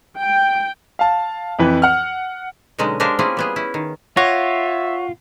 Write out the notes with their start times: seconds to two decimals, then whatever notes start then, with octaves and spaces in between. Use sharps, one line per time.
0.19 G5
0.99 F5 A5
1.59 F2 E3 B4
1.82 F#5 F6
2.78 B2 D3 F#3 G#3 C#4 D#4
3.00 G#3 D4 G4 A#4 C5 F5
3.19 A#3 C4 C#4 E4 F4 G#4
3.37 G3 B3 G#4
3.56 C#4 E4
3.74 D#3
4.17 F4 C#5 E5 F#5 A#6